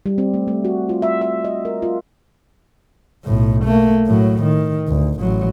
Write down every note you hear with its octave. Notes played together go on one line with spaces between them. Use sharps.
G3
C4
A3
A3
F#4
F4
E5
E5
D#5
A#4
F4
B1 A2
A3 A#3
A2 F#3
D#3
D2
A1 F#3